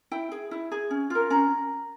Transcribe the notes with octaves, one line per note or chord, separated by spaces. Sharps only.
E4 G5
G#4
E4
G#4
C#4
F4 A#4
C#4 A#5